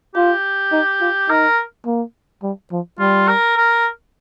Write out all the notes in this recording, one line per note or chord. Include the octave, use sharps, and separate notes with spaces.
F4 G4
D#4
F4
D#4 A#4
A#3
G3
F3
G3 F4
A#4
A#4